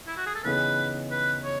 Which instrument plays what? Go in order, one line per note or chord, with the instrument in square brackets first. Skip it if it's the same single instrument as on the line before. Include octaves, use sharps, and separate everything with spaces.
[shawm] E4
F#4
G#4
A4
[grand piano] C#3 E3 B3 D#4 G#4 [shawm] B4
[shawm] B4
C#5